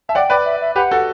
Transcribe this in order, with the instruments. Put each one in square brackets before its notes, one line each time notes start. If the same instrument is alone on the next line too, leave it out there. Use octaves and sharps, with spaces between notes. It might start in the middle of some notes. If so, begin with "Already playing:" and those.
[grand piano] E5 [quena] A5
[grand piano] D5 F#5 [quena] G5
[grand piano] B4 D5
[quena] E5
E5
[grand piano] G4 B4 [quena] F#5
[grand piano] F#4 A4